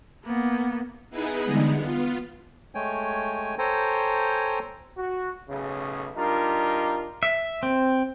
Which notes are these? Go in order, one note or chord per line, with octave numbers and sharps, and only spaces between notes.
A#3 B3
B3 D#4 E4 G#4 B4
D3 E3 G3 G#3 B3 D#4
B3 F4
G#3 A3 C#5 G5 G#5
A4 C5 C#5 G5 G#5 A#5
F#4
B1 A2 C#3
G3 D4 D#4 F4 A#4
E5
C4